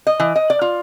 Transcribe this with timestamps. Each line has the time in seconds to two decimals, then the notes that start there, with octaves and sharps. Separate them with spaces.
0.07 D#5
0.20 E3
0.36 D#5
0.50 D5
0.61 F4